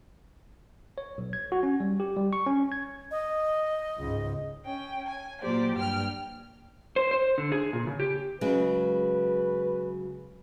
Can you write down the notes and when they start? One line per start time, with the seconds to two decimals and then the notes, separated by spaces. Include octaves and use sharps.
0.98 C#5
1.18 B1
1.33 G#6
1.52 F#4
1.63 C#4
1.80 G3
2.00 G4
2.16 G3
2.33 C#6
2.46 C#4
2.72 G#6
3.11 D#5
3.98 C#2 G#2
4.64 C#4 G5
5.08 G#5
5.42 A#2 F#3 A#3 G4 C5 D5
5.76 G2 G5 F6
6.96 C5
7.11 C5
7.38 D3
7.52 G#4
7.73 A#2
7.87 C#3
8.00 G4
8.41 C#3 F#3 G#3 B4